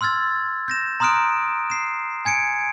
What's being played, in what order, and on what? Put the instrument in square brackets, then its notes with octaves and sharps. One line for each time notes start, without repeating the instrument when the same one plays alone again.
[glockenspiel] C6 E6 F6 G#6 A6
G6 A#6 E7
A#5 C6 D#6 F6 F#6 D7
C7 E7
G#5 G#6 C#7 D7